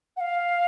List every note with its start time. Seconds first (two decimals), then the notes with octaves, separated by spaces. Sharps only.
0.17 F#5
0.21 F5